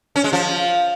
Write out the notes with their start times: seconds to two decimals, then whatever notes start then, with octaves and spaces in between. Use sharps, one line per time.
0.16 C#4
0.24 G#3
0.33 F3